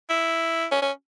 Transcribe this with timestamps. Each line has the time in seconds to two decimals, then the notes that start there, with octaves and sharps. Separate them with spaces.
0.09 E4
0.72 C#4
0.82 C#4